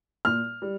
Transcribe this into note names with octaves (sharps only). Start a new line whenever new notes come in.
A#2 F6
G3